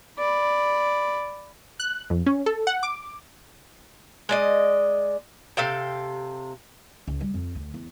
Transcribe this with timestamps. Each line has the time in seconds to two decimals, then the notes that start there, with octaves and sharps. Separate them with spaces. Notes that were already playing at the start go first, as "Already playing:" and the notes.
0.19 D5 B5
1.80 F#6
2.10 F2
2.26 C#4
2.46 A4
2.67 F#5
2.83 D6
4.29 G#3 D5 D#5
5.57 C3 A4 F5 G5
7.07 C#2
7.21 G3
7.34 F2
7.55 D2
7.74 E2